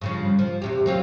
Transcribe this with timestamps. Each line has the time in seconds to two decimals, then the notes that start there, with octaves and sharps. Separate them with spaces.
0.01 G2 C#3 F3
0.39 F3
0.62 E2 C3 G4
0.86 F#3 C4 F4